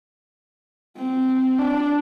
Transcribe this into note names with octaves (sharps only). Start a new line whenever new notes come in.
C4
D4